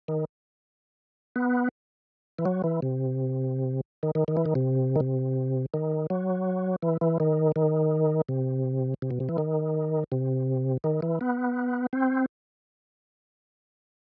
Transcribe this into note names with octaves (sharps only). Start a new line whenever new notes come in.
D#3
B3
E3
F#3
E3
C3
D#3
D#3
D#3
E3
D#3
C3
D#3
C3
D#3
F#3
E3
E3
D#3
D#3
C3
C3
B2
C3
E3
D#3
C3
D#3
E3
B3
C4